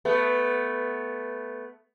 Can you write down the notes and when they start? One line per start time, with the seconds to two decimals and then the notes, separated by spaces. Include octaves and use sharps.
0.05 A3 B3